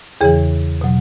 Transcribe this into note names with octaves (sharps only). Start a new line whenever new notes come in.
E2 C#3 E3 G#4
B2 F#3